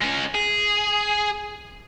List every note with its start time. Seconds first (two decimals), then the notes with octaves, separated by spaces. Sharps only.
0.01 G#3 C#4
0.35 G#4